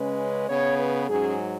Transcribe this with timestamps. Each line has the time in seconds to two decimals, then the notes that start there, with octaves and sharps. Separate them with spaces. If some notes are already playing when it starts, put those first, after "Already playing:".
Already playing: C#3 G#3 C#4 B4
0.49 C#3 B3 C#5
0.79 B4
1.08 G#2 F#3 C#4 G#4